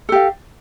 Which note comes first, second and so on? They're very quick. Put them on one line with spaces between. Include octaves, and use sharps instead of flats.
A4 G4 F5